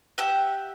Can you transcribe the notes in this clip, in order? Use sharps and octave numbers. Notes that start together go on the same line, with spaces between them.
G4 E5 F#5